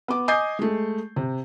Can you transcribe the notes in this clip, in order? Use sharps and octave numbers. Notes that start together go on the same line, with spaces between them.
B3 D6
D#5 G#5 D6 D#6 G6 C7
G#3 A3
C3